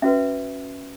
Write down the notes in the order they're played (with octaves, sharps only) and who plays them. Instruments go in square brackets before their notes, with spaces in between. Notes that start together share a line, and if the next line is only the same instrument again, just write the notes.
[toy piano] C#4 F#4 B4 E5